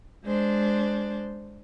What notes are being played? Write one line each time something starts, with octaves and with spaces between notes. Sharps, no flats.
G#3 D4 C5